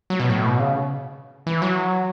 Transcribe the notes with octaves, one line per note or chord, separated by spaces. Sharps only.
F#3
B2
A2
B2
C#3
E3
F#3